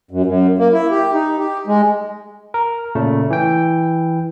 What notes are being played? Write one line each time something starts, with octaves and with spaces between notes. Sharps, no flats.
F#2
F#2
A#3
E4
G4
D#4
G4
G#3
A#4
A#2 C#3 A3
E3 G5